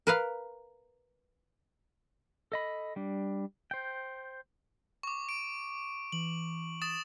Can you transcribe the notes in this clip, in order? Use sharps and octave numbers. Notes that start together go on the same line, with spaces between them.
A#4 B4 F5
A4 D#5 B5
G3 D4
C5 G5
C#6 D6
D7
E3 F#7
D#6 A6 E7